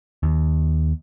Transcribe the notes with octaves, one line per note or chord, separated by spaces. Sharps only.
D#2